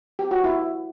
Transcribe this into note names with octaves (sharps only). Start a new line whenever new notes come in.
G4
F#4
E4